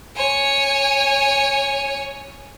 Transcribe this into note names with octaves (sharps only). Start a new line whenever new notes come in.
C#5 G#5